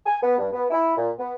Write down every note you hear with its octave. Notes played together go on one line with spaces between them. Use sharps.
G#5
B3
G2
B3
E4
A#2
B3